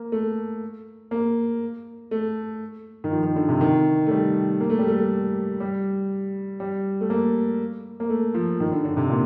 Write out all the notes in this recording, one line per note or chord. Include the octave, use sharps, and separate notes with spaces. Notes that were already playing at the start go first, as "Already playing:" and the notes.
Already playing: A#3
A3
A#3
A3
D#3
F3
D#3
D3
C3
D#3
A3
G3
A#3
A3
G3
A3
G3
G3
A3
A#3
A#3
A3
F3
D#3
D3
D3
C3
A#2